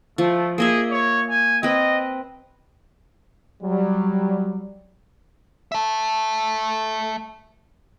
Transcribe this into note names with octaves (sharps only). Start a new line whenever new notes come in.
F3 A3
A#3 G#4 D#5 E5
C#5
G#5
C4 B4 D#5
F#3 G3
E5 A5